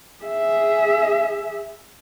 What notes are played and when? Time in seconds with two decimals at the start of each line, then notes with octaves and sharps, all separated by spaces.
0.24 G#4 E5